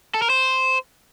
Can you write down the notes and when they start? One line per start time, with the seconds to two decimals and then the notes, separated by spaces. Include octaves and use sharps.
0.14 A4
0.22 A#4
0.30 C5